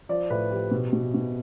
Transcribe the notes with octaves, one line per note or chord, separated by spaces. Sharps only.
F3 D5
A2 B4
F3 G4
B2
B2
B2